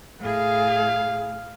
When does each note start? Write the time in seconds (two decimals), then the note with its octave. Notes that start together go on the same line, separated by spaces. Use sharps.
0.21 A2 G#4 F5